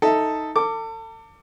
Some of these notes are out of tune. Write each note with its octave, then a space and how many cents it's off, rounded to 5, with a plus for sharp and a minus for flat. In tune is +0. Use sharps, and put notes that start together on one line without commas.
D#4 +10 A4 +5 E5 +0
A4 +35 D6 +0